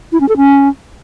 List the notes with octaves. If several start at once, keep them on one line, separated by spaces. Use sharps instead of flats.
E4
C#4
A4
C#4